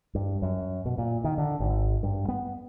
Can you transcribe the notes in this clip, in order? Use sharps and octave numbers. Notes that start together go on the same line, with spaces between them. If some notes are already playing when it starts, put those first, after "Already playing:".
G2
F#2
B2
A#2
D#3
D3
G#1
G2
B3